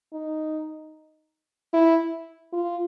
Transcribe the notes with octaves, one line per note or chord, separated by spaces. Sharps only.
D#4
E4
F4